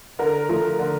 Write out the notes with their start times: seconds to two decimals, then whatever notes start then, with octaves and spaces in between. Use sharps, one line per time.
0.19 D3 A#4
0.49 F3 A3
0.79 D3